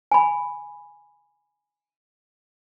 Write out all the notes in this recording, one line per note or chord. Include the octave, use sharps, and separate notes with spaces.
G#5 B5